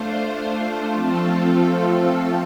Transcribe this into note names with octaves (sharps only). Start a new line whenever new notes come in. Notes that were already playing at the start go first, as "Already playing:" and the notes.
Already playing: A3 D4 F4 C5
F3 A3 C4 F4 A4